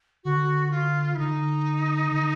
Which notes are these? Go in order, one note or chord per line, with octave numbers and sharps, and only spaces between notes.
D3 F#4
F4
E4
D3 D#4
D3